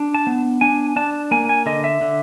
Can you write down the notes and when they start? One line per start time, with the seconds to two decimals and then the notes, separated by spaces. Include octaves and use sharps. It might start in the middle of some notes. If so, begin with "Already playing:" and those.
Already playing: D4
0.14 A5
0.27 B3
0.61 D4 G#5
0.96 D4 A5
1.31 A#3 G#5
1.49 G#5
1.66 D3 D#5
1.84 E5
2.01 D3